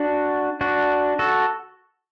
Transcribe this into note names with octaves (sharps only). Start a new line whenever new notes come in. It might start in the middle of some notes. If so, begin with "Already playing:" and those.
Already playing: D4 F#4
D4 F#4
F#4 A4